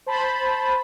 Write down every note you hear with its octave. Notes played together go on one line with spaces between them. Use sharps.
C5 A5 B5